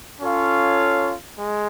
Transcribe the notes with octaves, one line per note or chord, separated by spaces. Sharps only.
C#4 F4 A4 C#5 F5
G#3